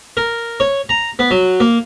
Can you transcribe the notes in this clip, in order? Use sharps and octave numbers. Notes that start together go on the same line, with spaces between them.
A#4
C#5
A#5
B3
F#3
A#3